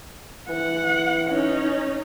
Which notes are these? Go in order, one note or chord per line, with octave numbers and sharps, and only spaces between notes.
E3 F#5
C#4 D#4